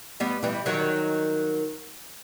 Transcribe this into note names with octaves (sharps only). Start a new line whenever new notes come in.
G3 B3
E3 G3
D#3 F#3